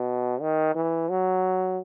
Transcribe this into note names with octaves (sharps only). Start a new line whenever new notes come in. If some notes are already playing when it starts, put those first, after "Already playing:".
Already playing: B2
D#3
E3
F#3